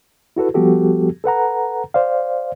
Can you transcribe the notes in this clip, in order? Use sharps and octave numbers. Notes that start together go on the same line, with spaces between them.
E4 F#4 A4 B4
F3 G3 B3 F#4 G4 A4
A4 B4 F#5 A#5
C5 D5 F5